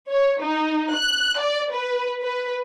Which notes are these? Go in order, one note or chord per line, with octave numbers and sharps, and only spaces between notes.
C#5
D#4
F#6
D5
B4
B4